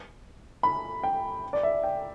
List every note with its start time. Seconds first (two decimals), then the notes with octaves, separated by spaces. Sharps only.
0.63 B5
1.03 G5
1.53 D5
1.63 E5
1.83 G5